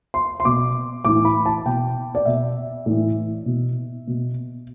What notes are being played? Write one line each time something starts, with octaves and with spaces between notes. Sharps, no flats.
C6
C6
B2 D6
A2 E3 D6
B5
A5
B2 G5
D5
B2 E5
A2 E3
B2
B2